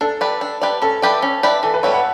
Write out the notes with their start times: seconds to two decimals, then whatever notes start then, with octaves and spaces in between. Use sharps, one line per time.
0.01 D4 A4
0.21 G4 B4 D5
0.41 D4
0.61 G4 B4 D5
0.82 C#4 A4
1.02 E4 G4 B4 D5
1.22 C#4
1.43 E4 G4 B4 D5
1.63 E3 A4
1.74 B4
1.83 G3 B3 E4 C#5
1.94 F#5